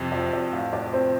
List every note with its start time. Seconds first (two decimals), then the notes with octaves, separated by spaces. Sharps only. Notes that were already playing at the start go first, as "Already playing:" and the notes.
Already playing: F2 C3
0.12 F3 D5
0.32 F2 D5
0.53 A2 F5
0.72 A3 D5
0.93 C4 C5